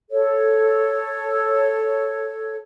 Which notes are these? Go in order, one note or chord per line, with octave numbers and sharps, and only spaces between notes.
A4 C#5